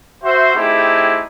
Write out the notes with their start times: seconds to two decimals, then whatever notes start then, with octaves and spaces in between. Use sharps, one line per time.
0.23 F#4 C5 E5
0.56 A3 C4 D#4 E4 G4 G#4